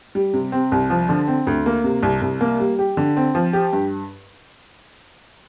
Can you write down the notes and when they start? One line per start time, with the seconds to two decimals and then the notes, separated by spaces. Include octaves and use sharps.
0.15 G3
0.33 C3
0.52 C4
0.72 C2
0.90 F3
1.09 D3
1.28 C4
1.47 D2
1.66 A#3
1.84 C3
2.03 C2
2.22 C2
2.41 A#3
2.60 G3
2.79 G4
2.97 D3
3.17 C4
3.35 F3
3.53 G4
3.73 G2